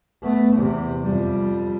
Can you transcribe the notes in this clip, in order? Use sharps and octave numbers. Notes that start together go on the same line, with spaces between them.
A3 B3
E2 C3
F2 G3